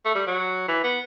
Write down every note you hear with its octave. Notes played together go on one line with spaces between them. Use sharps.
A3
G3
F#3
E3
B3